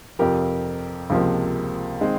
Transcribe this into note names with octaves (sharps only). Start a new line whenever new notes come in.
F2 C3 F3 G4 A#4
C#2 C3 F3 A#3
D#3 G#3 C4